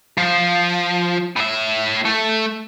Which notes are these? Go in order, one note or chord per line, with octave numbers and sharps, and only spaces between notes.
F3
A2 E5
A3